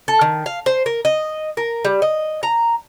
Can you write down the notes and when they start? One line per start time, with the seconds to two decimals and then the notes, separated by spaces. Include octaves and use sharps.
0.08 A4
0.21 D#3
0.46 F5
0.66 C5
0.86 A#4
1.05 D#5
1.57 A#4
1.85 G3
2.02 D#5
2.43 A#5